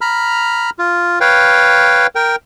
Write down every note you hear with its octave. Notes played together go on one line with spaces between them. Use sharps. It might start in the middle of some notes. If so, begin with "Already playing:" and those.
A#5 B5 F6
F4
B4 C#5 F5 G5
A#4 G5